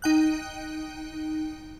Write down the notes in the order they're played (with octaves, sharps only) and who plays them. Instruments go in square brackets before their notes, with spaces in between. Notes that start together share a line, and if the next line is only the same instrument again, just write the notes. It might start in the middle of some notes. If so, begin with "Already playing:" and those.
[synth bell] D#4 G5 F#6